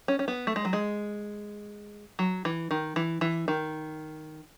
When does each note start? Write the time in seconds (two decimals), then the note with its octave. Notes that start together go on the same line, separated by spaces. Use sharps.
0.08 C#4
0.19 C#4
0.28 B3
0.47 A3
0.56 G#3
0.65 F#3
0.73 G#3
2.19 F#3
2.45 E3
2.71 D#3
2.96 E3
3.21 E3
3.48 D#3